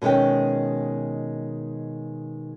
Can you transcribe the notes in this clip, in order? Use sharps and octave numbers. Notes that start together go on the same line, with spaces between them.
B2 D#3 G#3 C#4 G5